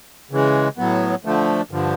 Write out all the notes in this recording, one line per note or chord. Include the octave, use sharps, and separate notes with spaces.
C#3 E3 G#3
A2 F#3 B3
D3 F3 A3
G2 D3 F3